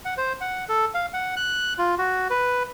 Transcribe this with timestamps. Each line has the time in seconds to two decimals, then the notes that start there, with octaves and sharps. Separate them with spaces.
0.05 F#5
0.17 C5
0.41 F#5
0.69 A4
0.94 F5
1.13 F#5
1.36 F#6
1.78 F4
1.98 F#4
2.30 B4